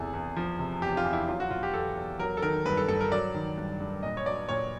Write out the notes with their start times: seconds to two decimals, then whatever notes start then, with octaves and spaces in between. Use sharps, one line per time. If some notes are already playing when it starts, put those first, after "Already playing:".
Already playing: E2 C3 E3 G#4 A4
0.14 E2
0.36 F3
0.59 C3
0.82 E2 G4
0.97 F4
1.05 E2
1.13 E4
1.28 F#3 F4
1.40 F#4
1.50 B2 F4
1.63 G4
1.74 E2 A4
1.96 E2
2.19 F#3 A#4
2.37 A4
2.42 D#3 A#4
2.65 G2 B4
2.77 A4
2.88 G2 A4
3.01 A#4
3.12 F#3 D5
3.34 D#3
3.57 G2
3.80 G2
4.03 A#2 D#5
4.17 C#5
4.26 F#3 D5
4.49 A#2 C#5